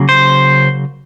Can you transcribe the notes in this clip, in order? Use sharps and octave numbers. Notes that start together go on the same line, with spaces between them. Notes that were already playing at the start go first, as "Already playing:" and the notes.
Already playing: C#3 F#3 A#3
C5